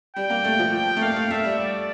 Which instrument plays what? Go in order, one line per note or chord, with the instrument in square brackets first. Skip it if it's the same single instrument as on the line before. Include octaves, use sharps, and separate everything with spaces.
[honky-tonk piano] G3 [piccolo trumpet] G5
[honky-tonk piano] A#3
A3
F3
[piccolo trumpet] G5
[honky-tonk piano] A3
[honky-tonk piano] A#3 [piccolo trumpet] F5
[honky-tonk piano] A3
[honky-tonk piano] A3 [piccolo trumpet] E5
[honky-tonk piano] G3
[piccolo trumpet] D5